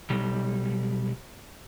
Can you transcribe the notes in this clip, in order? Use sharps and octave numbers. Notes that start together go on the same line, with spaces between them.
B1 G3